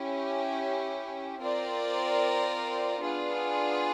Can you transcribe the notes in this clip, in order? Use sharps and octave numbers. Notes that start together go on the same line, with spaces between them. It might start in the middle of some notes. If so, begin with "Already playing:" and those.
Already playing: C#4 E4 G4
C4 F4 A#4 D5
B3 D4 F4 G#4